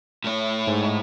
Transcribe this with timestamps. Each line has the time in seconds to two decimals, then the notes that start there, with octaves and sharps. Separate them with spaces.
0.24 A2 C#5
0.67 G#2